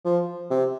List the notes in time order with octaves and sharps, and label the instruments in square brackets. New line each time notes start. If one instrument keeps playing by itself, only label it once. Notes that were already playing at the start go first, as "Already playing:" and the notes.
[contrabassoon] F3
C3